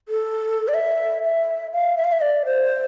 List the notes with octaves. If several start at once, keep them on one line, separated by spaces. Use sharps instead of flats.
A4
D5
E5
E5
F5
E5
F5
E5
D5
C5